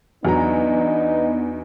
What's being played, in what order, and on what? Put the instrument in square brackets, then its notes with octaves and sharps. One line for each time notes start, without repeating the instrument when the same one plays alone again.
[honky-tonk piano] E2 F#3 A#5 [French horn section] B3 D4 [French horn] D#4